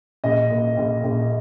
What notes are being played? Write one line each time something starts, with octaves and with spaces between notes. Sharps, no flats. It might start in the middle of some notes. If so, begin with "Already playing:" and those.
A#1 D#5
A#2
A#1
A#1